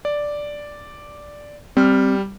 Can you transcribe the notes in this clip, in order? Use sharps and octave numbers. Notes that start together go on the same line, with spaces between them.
D5
G3 C4 F6